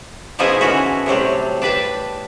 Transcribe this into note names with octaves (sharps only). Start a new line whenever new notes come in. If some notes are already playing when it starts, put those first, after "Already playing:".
B2 F3 B3 D#4 E4 G#4
D3 E3 C#4 E4 F#4
A2 C3 F#3 G3
D4 B4 G5 A5